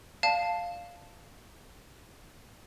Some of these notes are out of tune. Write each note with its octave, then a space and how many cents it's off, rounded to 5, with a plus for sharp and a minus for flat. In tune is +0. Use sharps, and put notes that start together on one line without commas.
D5 +0 F5 +0 A5 +0